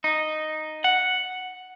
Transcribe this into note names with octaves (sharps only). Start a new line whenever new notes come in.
D#4
F#5